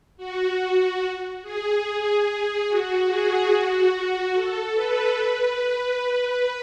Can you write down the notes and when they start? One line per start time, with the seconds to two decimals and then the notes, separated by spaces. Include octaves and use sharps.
0.17 F#4
1.42 G#4
2.25 G#4
2.67 F#4
3.08 G#4
3.50 F#4
4.34 A4
4.75 B4
5.17 B4